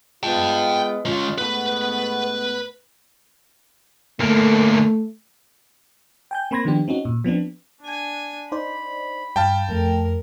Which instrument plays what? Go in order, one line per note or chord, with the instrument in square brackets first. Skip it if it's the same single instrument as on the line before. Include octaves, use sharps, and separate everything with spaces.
[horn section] G#3 B3 F4 [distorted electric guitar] G5 A5
[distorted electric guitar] G#3 C#4 [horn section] F4 F5
[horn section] G#2 A3 B3 [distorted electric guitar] B4
[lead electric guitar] D2 A#3 [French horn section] A3
[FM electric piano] G5 G#5 G6
A#3 C4 B5 C6 G#6 A#6
D#3 F3 B3 D4 G4
C4 C#4 D#4 F#4
A#2
F3 B3 C4 D4
[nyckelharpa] D4 G#5
[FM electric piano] D#4 C5 D5 [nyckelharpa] B5
[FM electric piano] G2 F5 [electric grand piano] G5 A5
[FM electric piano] F2 A3 [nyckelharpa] A#4